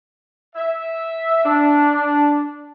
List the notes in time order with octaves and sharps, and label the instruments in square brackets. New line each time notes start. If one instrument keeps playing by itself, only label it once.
[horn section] E5
D4